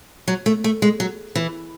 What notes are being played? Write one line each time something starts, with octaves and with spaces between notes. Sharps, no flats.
F#3
A3
A3
G#3
F#3
E3